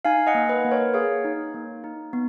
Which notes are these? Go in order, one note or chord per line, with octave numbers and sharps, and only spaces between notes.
D#4 F5 G#5
D#5 F#5
A#3
B4 D#5
A#3 B4
A#4 C#5
G#4 C#5 F5
D#4
A#3
D#4
B3